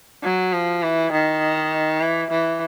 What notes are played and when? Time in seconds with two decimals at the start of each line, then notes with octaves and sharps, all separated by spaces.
0.23 F#3
0.53 F3
0.83 E3
1.12 D#3
2.01 E3
2.31 E3